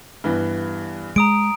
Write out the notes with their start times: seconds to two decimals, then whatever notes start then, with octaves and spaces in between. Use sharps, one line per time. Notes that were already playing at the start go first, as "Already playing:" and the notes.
0.24 G2 E3 B3
1.16 G#3 A#5 D#6 D7